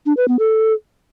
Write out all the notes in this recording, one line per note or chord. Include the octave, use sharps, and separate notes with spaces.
D4
B4
B3
A4